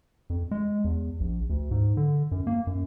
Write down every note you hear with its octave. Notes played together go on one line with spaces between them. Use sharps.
F2
G#3
E2
A#1
D2
G#2
D3
F#2
A#3
F#2